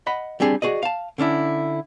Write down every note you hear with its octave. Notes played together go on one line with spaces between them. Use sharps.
D#5 F#5 B5
G3 C4 D4 G#4
F#4 G#4 D5 D#5
F5 A5
D3 C#4 D4 E4